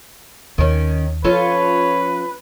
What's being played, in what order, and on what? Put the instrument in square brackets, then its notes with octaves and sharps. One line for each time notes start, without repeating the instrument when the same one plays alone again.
[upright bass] D#2 [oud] D#3 C#4
[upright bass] F3 [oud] C#4 F4 A4 [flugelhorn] B4 [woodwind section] C#5